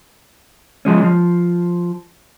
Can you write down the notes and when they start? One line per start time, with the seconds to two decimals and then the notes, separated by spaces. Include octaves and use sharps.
0.85 F3 G#3 C#4
1.03 F3